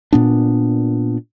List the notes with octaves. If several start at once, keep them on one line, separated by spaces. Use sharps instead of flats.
A#2 B3 D4